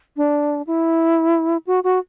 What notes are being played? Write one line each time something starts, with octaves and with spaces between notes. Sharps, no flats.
D4
E4
F#4
F#4